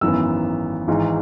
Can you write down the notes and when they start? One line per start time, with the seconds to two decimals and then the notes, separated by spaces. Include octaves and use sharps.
0.01 G#1 F#2 E3 B3 E6
0.88 G#1 G#2 E3